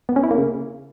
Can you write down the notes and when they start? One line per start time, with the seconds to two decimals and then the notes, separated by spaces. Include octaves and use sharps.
0.09 B3
0.16 C#4
0.23 E4
0.31 A#3
0.38 C#3